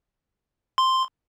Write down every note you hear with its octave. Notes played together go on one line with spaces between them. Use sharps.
C6